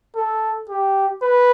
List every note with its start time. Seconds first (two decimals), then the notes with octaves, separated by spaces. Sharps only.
0.16 A4
0.69 G4
1.22 B4